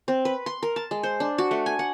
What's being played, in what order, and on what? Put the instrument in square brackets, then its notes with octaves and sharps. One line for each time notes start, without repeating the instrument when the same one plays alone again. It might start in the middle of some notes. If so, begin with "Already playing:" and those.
[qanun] C4
B4
C6
A#4
A5
G#3
C5
D4
F#4
A3
G#5
F#5